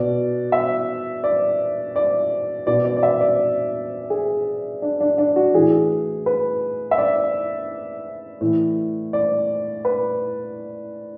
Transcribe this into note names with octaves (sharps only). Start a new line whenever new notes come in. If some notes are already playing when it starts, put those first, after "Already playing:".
Already playing: B2 D5
E5
D5
D5
B2 D5
D5
D5
E5
D5
G#4
D4
D4
D4
F#4
A2 E3 G#4
B4
E5
D5
A2 E3
D5
B4